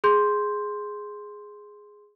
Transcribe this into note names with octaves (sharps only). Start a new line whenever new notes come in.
G#4 C6 G6